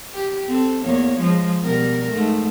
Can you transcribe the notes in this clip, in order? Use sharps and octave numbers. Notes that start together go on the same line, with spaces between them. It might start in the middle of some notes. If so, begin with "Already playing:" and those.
G4
C4 A4
E2 A#3 C#5
F3 G#3
B2 G3 A#4
G#2 A3